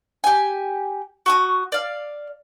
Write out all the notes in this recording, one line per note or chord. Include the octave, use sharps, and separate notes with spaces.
G4 G#5
F#4 C#6 D#6
D5 F5